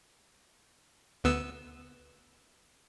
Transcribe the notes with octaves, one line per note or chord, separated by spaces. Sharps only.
D2 B3 E6